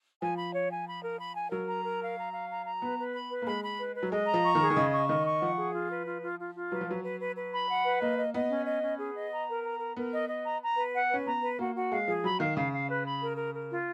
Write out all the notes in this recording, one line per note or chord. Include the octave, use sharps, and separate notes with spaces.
F3 G#5
B5
C#5
G#5
B5
A#4
B5
G#5
F#3 A#4
A#5
A#4
F5
A#5
F5
A#5
A#5
B3 B4
B4
B5
B4
A#3
G#3 B5
B5
B4
B4
F#3
G#3 D#5
A#5
F3
C#6
D#3
G#4
D#3
C#3 D#5
C#6
D#3 D#5
C#6
F3 F#5
G#4
F4
B4
F4
F4
F4
F4
F#3 B4
F3
F#3 B4
B4
B4
B4
B5
F#5
B4
A#3 D#5
D#5
B3 D#5
C#4
D#5
C#4
G#4
D#5
A#5
A#4
A#5
A#4
B3 A#4
D#5
D#5
A#5
A#5
B4
F#5
C#4 B4
B3 A#5
B4
A#3 F#4
F#4
G#3 F5
F3 G#4
F#3 B5
D#3 F5
C#3 F5
F5
B4
B5
A#4
A#4
A#4
F4